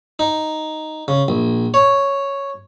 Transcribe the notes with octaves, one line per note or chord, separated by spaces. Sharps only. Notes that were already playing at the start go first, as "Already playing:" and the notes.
D#4
C#3
A#1
C#5